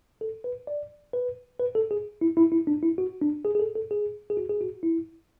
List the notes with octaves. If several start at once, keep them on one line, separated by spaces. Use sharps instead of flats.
A4
B4
D5
B4
B4
A4
G#4
E4
E4
E4
D4
E4
F#4
D4
G#4
G#4
A4
A4
G#4
G#4
F#4
G#4
F#4
E4